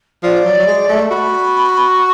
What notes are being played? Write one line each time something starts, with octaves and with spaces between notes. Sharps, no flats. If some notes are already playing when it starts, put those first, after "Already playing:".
F3 D5
F#3
F#3
G#3
A3
F#4 B5
C#6